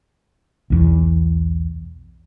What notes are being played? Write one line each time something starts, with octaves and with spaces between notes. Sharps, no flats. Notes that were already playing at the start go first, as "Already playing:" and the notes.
B1 E2